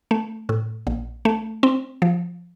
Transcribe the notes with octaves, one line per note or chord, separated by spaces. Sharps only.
A3
A2
A#1
A3
C4
F3